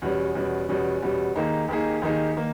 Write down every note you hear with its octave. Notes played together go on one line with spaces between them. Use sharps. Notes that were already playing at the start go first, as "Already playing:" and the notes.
E2 B2 G3 C#4
E2 B2 G3 C#4
E2 B2 G3 C#4
E2 B2 G3 C#4
D#2 D#3 A#3 D#4 G#4
D#2 D#3 A#3 D#4 G#4
D#2 D#3 A#3 D#4 G#4
D#3 A#3